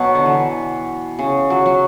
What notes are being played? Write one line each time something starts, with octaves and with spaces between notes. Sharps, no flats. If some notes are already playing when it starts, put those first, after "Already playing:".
Already playing: B2 F#3
D3
E3
C#3
F#3
F#3